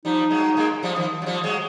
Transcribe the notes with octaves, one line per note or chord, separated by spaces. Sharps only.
F3 G3 D#4
F#3 G#3
G#3 A#3
F3 G3
D#3 F3
F#3
F3 G3
F#3 G#3